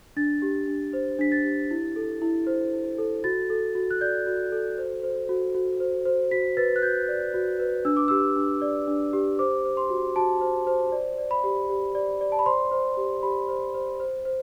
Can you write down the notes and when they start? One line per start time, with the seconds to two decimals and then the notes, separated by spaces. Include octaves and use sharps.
0.16 D4 A6
0.42 G4
0.67 D4
0.93 C5
1.19 D4 B6
1.32 A6
1.44 G4
1.71 E4
1.96 A4
2.22 E4
2.47 C5
2.73 E4
2.98 A4
3.24 F#4 A6
3.50 A4
3.75 F#4
3.91 F#6
4.01 D5 G6
4.27 F#4
4.52 A4
4.78 C5
5.03 C5
5.29 F#4
5.55 F#4
5.80 C5
6.05 C5
6.31 F#4 B6
6.57 B4 A6
6.76 F#6
6.82 F#4 G6
7.08 D5
7.34 F#4
7.60 B4
7.85 D4 E6
7.96 D6
8.08 G4 E6
8.36 D4
8.62 D5
8.88 D4
9.13 G4
9.39 C5 D6
9.65 C5
9.77 C6
9.90 F#4
10.16 F#4 A5
10.41 C5
10.67 C5
10.92 D5
11.18 D5
11.31 B5
11.44 G4
11.69 G4
11.95 D5
12.21 D5
12.32 A5
12.39 B5
12.46 C5 C6
12.72 C5
12.97 G4
13.23 G4 B5
13.49 C5
13.74 C5
14.00 C5
14.25 C5